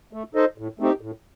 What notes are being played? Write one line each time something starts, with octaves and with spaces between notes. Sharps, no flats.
A3
D#4 A4 C5 D#5
A2
A3 C4 D#4 G4
A2